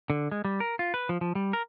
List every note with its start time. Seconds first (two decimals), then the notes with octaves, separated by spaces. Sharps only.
0.10 D3
0.31 G#3
0.45 G3
0.60 A#4
0.79 F4
0.94 B4
1.09 F3
1.21 F3
1.35 G3
1.53 A#4